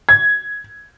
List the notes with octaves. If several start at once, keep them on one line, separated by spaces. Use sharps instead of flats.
G#6